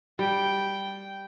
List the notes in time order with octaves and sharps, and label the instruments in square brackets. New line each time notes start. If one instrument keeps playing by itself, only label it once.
[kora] G3 [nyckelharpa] G5